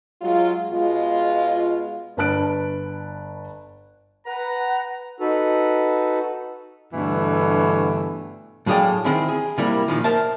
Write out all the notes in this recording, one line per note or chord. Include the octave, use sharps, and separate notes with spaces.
F#3 G#3 F4
B2 G#3 F4
G1 B4 A5 F#6 D7
B4 F#5 A#5
D#4 F#4 A4 B4
G2 B2 D3 E3 A3
A2 F#3 D4 G#4 F5 G5
D#3 C4 E4 G#4
G#4
C3 G3 A#3 E4 A#4
A#2 D#3 F3
A#4 C5 E5 A5